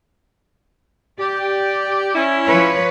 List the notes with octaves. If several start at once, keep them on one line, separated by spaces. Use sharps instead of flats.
G4 D5
C#4 E4
F3 B4 C#5